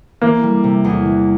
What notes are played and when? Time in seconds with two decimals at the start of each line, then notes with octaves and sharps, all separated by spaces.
0.22 E3 A#3
0.43 G3
0.64 C3
0.85 E2
1.05 E3